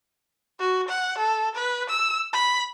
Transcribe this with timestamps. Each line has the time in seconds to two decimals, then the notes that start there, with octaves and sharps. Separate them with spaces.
0.59 F#4
0.89 F#5
1.18 A4
1.55 B4
1.89 E6
2.33 B5